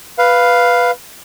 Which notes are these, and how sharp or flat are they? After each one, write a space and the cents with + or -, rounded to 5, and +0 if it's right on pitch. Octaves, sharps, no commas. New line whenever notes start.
B4 +0 F5 +0